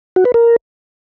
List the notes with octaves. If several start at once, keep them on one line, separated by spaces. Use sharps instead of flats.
F#4
B4
A#4